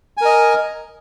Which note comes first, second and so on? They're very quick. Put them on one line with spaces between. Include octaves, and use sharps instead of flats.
G#5 A#4 D#5